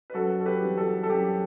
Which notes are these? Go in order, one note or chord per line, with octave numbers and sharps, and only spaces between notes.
B4
F#2 F#4 A4
A4
G4 B4
E3 G3 C4
F#4 A4
A4
F#2 G4